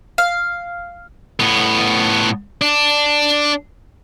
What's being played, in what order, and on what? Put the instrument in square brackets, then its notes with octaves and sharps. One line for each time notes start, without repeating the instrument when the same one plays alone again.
[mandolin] F5
[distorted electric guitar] A2 B3
D4